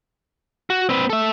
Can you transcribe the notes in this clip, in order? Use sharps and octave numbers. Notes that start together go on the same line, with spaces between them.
F#4
C4 B4
A4 E5